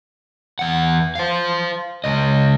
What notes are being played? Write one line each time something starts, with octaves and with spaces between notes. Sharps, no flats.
E2 F#5
C5 F5
C#2 D#5